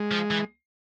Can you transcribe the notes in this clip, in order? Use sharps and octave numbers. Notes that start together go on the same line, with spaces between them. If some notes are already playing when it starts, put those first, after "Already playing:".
Already playing: G#3
F3
E3